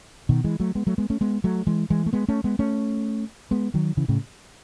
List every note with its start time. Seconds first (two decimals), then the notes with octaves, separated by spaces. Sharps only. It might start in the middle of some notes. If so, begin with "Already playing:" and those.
0.29 B2 D#3
0.44 E3 G#3
0.60 F#3 A3
0.75 G#3 B3
0.87 F#3 A3
0.98 G#3 B3
1.10 A3 C#4
1.21 G#3 B3
1.44 F#3 A3
1.67 E3 G#3
1.90 E3 G#3
2.06 A3
2.13 G#3 B3
2.28 A3 C#4
2.44 G#3 B3
2.59 A3 C#4
3.51 G#3 B3
3.74 D#3 F#3
3.97 C#3 E3
4.08 A2 C#3